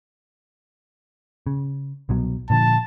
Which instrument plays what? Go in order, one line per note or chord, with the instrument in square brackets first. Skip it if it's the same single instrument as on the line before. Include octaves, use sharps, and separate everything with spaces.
[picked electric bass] C#3
C2 B2 F#3
[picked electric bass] A#2 D3 F3 [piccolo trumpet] A5